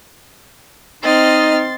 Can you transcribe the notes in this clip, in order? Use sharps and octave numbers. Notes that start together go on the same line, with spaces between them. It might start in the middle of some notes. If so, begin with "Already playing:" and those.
C4 D#4 D#5 C6 F6 A6